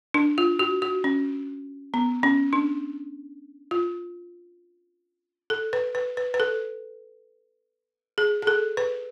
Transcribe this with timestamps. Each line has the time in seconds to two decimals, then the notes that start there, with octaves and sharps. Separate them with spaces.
0.14 D4
0.38 F4
0.59 F#4
0.82 F#4
1.04 C#4
1.94 B3
2.23 C#4
2.53 D4
3.71 F4
5.50 A4
5.73 B4
5.95 B4
6.17 B4
6.34 B4
6.40 A4
8.18 G#4
8.42 G#4
8.47 A4
8.77 B4